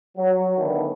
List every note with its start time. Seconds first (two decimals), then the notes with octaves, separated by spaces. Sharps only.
0.17 F#3
0.58 D3 D#3 A3 B3 C#4